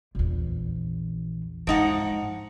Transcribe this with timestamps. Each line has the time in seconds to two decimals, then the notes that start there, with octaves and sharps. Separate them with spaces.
0.15 A#1 E2
1.67 G#2 F3 D#4 F#5